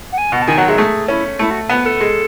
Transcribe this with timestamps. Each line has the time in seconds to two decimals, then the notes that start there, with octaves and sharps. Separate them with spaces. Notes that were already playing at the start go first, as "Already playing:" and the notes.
0.12 F#5
0.17 G#5
0.32 B2 F#5
0.42 A5
0.47 D#3 G#5
0.58 F#3 F#5
0.68 G#3 E5
0.77 A3 G#4
1.08 C#4 E4
1.39 A3 E4
1.50 F#4
1.70 B3 B4
1.85 A4
2.00 G#3